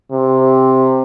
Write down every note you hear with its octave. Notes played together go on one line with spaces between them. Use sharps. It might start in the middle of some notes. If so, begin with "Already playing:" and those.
C3